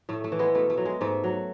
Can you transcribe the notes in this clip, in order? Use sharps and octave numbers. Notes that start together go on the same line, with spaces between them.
A2 A3
A3
E3
G#3 B3
B2 A3
A3
F#3
G#3
G#2 A3
F#3